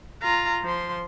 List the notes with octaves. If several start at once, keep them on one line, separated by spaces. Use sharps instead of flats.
F4 A#5
F3 C6